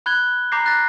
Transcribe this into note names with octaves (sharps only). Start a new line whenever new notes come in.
B5 F#6 G#6 G7
A#5 B5 D6 G6 A#6 C7
F#6 A6 A#6